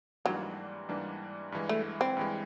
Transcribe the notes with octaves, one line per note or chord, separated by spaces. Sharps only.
G#2 E3 F#3 G3 A#3 D4
G#2 E3 G3 A#3 D4
G2 E3 G#3
A3
C4
G2 E3 G#3